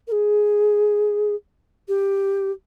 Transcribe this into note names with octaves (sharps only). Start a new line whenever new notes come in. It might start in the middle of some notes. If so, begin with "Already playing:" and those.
A#4
G#4
G4